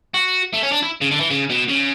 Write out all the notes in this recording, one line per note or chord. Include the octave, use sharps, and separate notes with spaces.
F#4
A3
C#4
D4
E4
C#3
D3
E3
C#3
B2
C#3